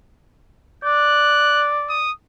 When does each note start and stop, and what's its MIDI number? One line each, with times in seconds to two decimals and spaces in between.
0.84 2.04 74
0.84 1.68 90
1.89 2.12 87